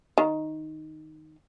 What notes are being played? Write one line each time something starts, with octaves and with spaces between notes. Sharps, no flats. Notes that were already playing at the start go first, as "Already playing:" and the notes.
D#3